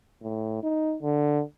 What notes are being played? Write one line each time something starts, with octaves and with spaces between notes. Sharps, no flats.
A2
D#4
D3